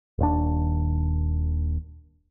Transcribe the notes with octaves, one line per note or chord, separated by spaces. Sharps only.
D#1 D#2 D4